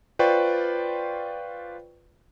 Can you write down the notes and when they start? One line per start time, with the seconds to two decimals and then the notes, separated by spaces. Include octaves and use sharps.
0.19 F4 B4 C5 D5 G5 C#6